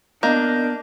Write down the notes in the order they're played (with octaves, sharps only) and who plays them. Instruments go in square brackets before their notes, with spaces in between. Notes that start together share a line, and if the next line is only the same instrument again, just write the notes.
[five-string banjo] A#3 [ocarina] B3 [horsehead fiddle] D4 [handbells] A#4 D#5 G6